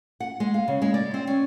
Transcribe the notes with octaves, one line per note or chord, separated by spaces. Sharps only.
F#5
G#3
F5
C#3
G#3
D5
C4
C#4